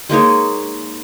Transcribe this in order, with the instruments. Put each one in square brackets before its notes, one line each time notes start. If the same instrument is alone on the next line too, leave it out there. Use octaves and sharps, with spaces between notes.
[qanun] G#3 A#3 D#4 C#5